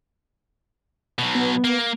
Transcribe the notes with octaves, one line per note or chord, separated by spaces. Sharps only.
B2 F#3
B3
A#3